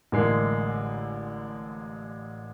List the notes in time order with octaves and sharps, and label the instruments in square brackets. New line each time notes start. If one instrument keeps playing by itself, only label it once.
[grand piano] A1 D3 G#3 A#3 C7